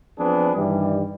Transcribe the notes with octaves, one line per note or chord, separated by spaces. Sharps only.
F3 B3 C4 D4 G#4 B4
G2 D#3 E3 G3